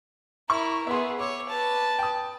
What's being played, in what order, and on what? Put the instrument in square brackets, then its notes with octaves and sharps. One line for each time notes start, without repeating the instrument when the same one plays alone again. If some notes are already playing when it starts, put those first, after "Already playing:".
[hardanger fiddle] E4 A#4 [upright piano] C#6
[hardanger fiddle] B3 G#4 [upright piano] E5 C6
[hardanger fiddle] C#5 [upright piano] D6 E6
[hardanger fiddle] B4 A5
[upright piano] G5 D#6